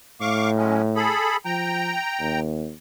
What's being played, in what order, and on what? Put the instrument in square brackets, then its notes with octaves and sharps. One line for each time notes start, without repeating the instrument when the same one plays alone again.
[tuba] A2 [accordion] F5 C#6 D6
[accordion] F#3 G#3 C#4
G#4 A4 B5
[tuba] F3 [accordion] G5 A#5
[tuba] D#2